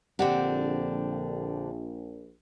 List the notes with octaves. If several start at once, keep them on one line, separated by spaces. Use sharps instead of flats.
A#1 D3 C4 D4 G4 F#5